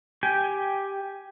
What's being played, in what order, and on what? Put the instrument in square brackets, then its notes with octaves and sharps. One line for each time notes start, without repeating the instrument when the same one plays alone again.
[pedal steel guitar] G4 G5 G#5